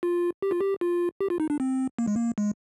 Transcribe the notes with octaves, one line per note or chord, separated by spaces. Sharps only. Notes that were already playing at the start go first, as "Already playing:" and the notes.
F4
G4
F4
G4
F4
G4
F4
D#4
D4
C4
A#3
G#3
A#3
G#3